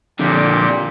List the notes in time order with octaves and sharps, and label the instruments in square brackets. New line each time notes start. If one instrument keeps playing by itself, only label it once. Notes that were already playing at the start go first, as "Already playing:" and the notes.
[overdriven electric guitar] F2 D3 [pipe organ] A#2 G4